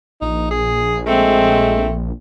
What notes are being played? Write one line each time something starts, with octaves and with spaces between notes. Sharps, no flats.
A#1 D#4
G#4
G#3 A3 C4